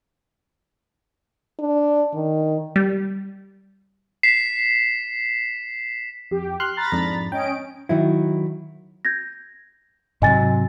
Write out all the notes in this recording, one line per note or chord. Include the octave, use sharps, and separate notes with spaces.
D4
D#3
G3
B6 C7 E7
F2 G4
C6 F6 F#6
A#5 B5 A6
F2 G#2 D4
C#4 D#5 G5 D7
D#3 F#3 E4
G6 G#6 A#6
G#2 C3 F#3 D#5 G#5 A6